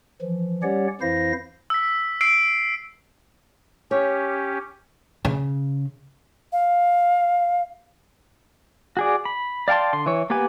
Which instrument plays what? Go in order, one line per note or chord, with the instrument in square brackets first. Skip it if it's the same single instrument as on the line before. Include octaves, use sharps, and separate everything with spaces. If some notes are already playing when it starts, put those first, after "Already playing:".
[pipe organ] E3 F3
G3 C#4 G4 C#5 D5 F#5
F2 E3 E4 C5 F5 A#6
[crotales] E6 B6
E6 C7 D7
[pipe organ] C#4 G4 [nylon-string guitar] C#5
[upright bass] C#3
[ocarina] F5
[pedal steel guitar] F#4 G#4 D5
B5
D5 F5 G5 A5 C6
D3 C6
E3 C#5
A#3 B3 G4 B4 G#5